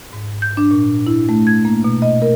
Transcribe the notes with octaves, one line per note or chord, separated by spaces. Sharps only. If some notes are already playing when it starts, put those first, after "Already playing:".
G#2
G6
D4
A#2
E4
A3
G#6
A#3
B2
D#5
A#4